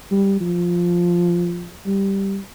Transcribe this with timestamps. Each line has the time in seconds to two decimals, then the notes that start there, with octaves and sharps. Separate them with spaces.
0.11 G3
0.40 F3
1.86 G3